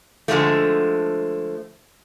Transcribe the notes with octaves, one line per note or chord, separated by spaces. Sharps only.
D3 F3 G#3 A3